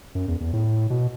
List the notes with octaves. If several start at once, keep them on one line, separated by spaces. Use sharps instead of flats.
F#2
E2
E2
A2
B2